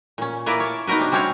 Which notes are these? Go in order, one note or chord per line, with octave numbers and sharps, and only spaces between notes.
A#2 C#4
A#3 E4 A#4 B4 D5 F5
C#5 A5
B3 D#4 F#4 A#4 B4
C3 D4
G3 C4 C#4 F#4 C#5 F5